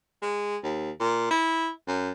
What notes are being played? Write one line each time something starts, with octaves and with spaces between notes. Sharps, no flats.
G#3
D#2
A#2
E4
F#2